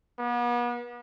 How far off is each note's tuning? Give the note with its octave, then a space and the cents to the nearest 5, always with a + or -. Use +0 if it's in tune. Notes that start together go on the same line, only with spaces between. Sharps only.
B3 -40